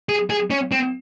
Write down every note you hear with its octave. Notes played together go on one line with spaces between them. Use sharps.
G#4
G#4
C#4
C4